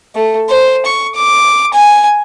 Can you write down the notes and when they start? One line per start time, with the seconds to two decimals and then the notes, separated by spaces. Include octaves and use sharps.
0.15 A3
0.49 C5
0.86 C#6
1.15 D6
1.74 G#5